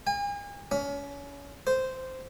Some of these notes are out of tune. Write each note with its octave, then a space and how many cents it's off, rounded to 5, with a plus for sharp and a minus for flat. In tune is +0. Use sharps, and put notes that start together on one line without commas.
G#5 -40
C#4 +30
C5 -10